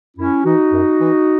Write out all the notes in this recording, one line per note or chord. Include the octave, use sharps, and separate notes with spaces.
F#2 C#4 E4
E3 D#4 F#4
F#2
E3